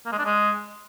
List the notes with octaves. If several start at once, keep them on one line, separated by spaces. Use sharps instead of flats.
A#3
G#3
D4
G#3